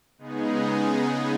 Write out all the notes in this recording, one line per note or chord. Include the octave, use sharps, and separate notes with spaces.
C#3 G#3 B3 D#4 G#4